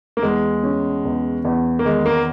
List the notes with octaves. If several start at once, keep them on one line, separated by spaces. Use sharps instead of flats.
A#3
E2 G#3
C#4
E2
E2
A#3
D#3 G#3
A#3